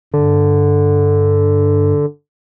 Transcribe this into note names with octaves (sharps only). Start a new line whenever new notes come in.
G2 D3